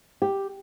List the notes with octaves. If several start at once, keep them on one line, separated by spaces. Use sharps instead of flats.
G4